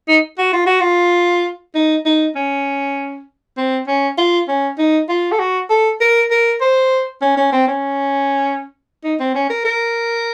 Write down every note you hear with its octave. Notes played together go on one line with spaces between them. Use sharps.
D#4
F#4
F4
F#4
F4
D#4
D#4
C#4
C4
C#4
F4
C#4
D#4
F4
A4
F#4
A4
A#4
A#4
C5
C#4
C#4
C4
C#4
D#4
C4
C#4
A#4
A#4